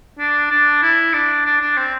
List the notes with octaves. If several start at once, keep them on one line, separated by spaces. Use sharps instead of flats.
D4
D4
E4
D4
D4
D4
C4